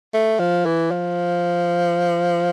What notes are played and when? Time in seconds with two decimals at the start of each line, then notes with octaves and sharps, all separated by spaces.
0.14 A3
0.39 F3
0.66 E3
0.91 F3